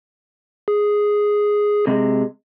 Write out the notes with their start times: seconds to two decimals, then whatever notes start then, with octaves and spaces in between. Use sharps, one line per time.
0.68 G#4
1.87 C3 G#3